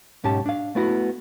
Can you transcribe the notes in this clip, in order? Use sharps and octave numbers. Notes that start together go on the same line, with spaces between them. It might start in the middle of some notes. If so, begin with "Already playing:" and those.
B1 G#2 C#4 G4 A5
D4 F5
A3 B3 E4 F#4